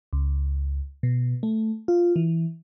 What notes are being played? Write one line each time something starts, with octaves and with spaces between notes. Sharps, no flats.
C#2
B2
A3
F4
E3